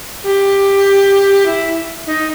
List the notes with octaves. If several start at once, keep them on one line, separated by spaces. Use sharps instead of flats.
G4
E4
D#4